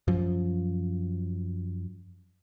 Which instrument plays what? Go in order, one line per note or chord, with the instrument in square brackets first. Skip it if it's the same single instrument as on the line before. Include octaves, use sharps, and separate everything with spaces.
[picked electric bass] F#2 F3